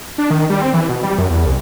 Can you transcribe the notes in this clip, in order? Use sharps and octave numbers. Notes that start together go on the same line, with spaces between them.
D4
D#3
G3
C4
E3
B2
G3
F#2
E2
C2